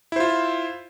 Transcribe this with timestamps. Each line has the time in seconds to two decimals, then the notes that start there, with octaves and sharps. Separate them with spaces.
0.12 E4
0.16 C5
0.20 F4